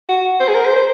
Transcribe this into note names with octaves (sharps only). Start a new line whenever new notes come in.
F#4
C5
G#4
A#4
C5
C5